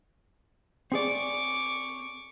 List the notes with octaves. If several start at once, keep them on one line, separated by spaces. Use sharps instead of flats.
C4 G#4 D5 C#6 D6